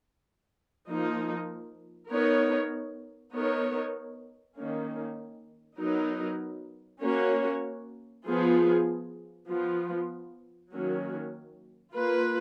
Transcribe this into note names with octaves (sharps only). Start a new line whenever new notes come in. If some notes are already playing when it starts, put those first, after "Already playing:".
F3 A#3 D#4
B3 D#4 A#4 C#5
B3 D#4 A#4 C#5
D#3 A#3 C#4
F#3 B3 D#4 A#4
A#3 C#4 F#4 C#5
F3 B3 F4 G#4
F3 B3 F4
D#3 F#3 A#3 C#4 F#4
A#3 F4 B4